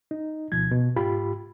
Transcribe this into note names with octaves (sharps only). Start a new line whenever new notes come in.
D#4
D2 B2 F3 G#6
B2
G#2 F4 G4 B5